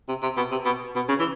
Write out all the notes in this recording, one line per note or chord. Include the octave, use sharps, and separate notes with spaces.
C3
C3
B2
C3
B2
B2
C#3
E3